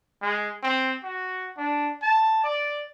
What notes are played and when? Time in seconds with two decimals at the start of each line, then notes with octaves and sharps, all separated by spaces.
0.22 G#3
0.63 C4
1.03 F#4
1.57 D4
2.02 A5
2.44 D5